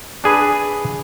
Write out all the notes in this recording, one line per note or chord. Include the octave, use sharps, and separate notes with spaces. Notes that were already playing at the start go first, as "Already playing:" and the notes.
D4 G#4 B4